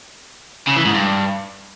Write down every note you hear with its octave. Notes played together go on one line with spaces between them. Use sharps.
C#3
E3
G#2
G2